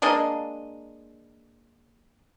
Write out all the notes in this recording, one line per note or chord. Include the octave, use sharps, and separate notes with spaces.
G#3 A#3 D4 D#5